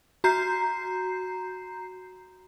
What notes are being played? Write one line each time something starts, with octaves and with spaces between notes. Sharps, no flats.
F#4 A#5 G6 C7